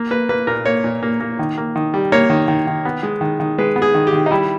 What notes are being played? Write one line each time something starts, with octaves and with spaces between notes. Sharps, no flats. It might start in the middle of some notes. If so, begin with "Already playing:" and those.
Already playing: A#3
A#3 B4
A#3 B4
A#2 A#4
A#3 C#5
A#2
A#3
A#3
D#3
A#3
D#3
G3
A#3 C#5
D#3
D#3
D#3
B3
G#3
D#3
D#3
G#3 B4
B3
G#4
D#3
G4
D#3
D#4
G3 E4